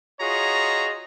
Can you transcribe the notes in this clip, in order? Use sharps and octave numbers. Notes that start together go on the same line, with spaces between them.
F4 F#4 G#4 C#5 D#5 A#5